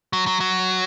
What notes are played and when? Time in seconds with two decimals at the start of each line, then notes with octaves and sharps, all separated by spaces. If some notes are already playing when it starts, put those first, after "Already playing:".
0.13 F#3
0.27 F#3
0.40 F#3